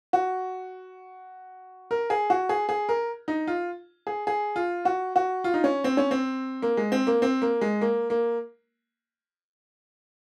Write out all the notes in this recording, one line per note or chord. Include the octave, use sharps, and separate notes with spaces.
F#4
A#4
G#4
F#4
G#4
G#4
A#4
D#4
F4
G#4
G#4
F4
F#4
F#4
F4
D#4
C#4
C4
C#4
C4
A#3
G#3
C4
A#3
C4
A#3
G#3
A#3
A#3